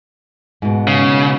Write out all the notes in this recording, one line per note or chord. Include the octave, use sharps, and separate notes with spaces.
G#2 B2
C#3